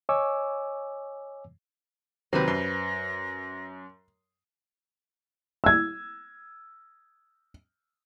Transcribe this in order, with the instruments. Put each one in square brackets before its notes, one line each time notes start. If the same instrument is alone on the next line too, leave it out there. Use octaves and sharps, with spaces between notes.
[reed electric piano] C#5 D#5 G#5 C#6 D6 E6
[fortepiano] D#2 C3 [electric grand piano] F#3 [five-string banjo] B4 C5 [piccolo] A#6
[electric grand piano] F#2 [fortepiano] C6
[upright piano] E6 G#6